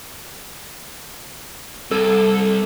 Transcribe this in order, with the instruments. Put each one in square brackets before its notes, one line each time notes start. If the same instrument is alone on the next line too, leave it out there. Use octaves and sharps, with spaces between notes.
[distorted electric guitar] C2 [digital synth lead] A4